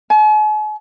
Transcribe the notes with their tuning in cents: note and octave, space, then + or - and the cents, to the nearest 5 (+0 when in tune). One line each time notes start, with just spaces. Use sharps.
G#5 +45